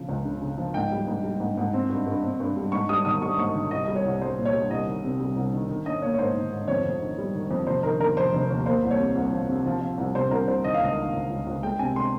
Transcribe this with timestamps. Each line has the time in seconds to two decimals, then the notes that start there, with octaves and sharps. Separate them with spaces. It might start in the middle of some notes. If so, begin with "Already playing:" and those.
Already playing: C#3 F3
0.09 C#2
0.25 C#3
0.42 C#3
0.58 F3
0.74 G#2 G5
0.92 G3
1.07 G#2
1.24 G3
1.40 G#2
1.57 G#2
1.73 C4
1.89 G2
2.07 G2
2.23 C4
2.40 G2
2.57 G3
2.72 G#2 C#6
2.89 G3 D#6
3.05 D#3 D#6
3.22 G3 C#6
3.38 G#2 C#6
3.55 D#3
3.71 C2 D#5
3.84 G3 D#5
3.96 C#5
4.05 C2
4.21 G3 C5
4.37 A#2
4.45 C#5
4.53 G3
4.70 C2 D#5
4.87 D#3
5.04 C3
5.20 G3
5.36 C2
5.53 D#3
5.69 D#3
5.86 C#4 D#5
6.02 A#3 C#5
6.14 C#5
6.19 G#2 C5
6.35 D#3
6.51 G#2
6.68 F2 C#5
6.85 F2
7.02 D#3
7.18 G3
7.35 D#3
7.51 F2
7.67 F1 C5
7.83 D#3 A#4
8.00 D#3 A#4
8.16 F1 C5
8.33 F1
8.50 D#2
8.66 A#3 C5
8.83 C2
8.91 C#5
8.99 C3
9.16 C2
9.33 F3
9.49 C3
9.66 F3
9.81 F3
9.98 C2
10.15 C3 C5
10.30 C2 A#4
10.47 C2 C5
10.64 D#3 D#5
10.74 F5
10.81 C#2 D#5
10.97 D#3
11.13 C#2
11.29 C#2
11.47 C#2
11.63 G#3 G5
11.79 C3 G#5
11.95 G#3 C6